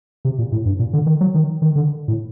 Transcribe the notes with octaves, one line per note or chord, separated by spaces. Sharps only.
C3
A#2
A2
G2
A#2
D3
D#3
F#3
D#3
D#3
D3
A2